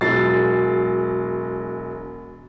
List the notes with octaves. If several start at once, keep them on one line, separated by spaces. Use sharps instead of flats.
E1 F#3 G#3 A6 C7